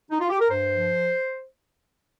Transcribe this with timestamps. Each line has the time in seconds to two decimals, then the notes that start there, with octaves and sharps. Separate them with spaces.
0.10 D#4
0.20 F4
0.30 G4
0.40 A#4
0.49 G2 C5
0.72 F3